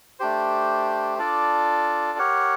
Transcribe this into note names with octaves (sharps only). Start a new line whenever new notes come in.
A3 D4 G4 C5
D4 F4 A4 D5
G4 A#4 C#5 F#5